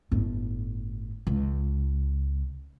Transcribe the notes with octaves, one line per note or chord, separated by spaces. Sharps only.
G1 A2
C#2